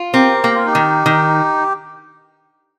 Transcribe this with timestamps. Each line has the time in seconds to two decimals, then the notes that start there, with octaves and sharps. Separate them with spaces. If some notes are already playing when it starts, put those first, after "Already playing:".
Already playing: F4
0.13 C4 G4 A#4
0.44 A#3 G4
0.55 F4
0.66 D#4 G4
0.75 D#3
1.06 D#3